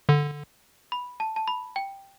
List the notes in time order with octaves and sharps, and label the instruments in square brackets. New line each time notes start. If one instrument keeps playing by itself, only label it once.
[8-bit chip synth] D3
[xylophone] B5
A5
A5
B5
G5